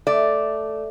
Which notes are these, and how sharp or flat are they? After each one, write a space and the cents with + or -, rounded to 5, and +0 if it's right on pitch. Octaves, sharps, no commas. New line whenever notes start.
A3 +0 D5 +0